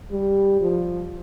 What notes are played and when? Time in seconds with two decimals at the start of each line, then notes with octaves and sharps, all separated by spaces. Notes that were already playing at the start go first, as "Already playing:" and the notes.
0.12 G3
0.61 F3